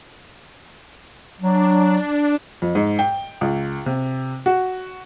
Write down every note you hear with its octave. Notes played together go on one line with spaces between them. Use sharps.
F#3 D4
F2
G#2
G5
C#2
C3
F#4